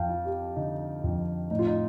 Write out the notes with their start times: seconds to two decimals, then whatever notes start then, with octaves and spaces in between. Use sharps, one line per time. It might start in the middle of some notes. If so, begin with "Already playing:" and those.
Already playing: F2 F5 G5 A5
0.09 F3
0.25 G4
0.56 D3 D#4
1.04 F2
1.50 A2 D#4
1.59 F4
1.67 D#4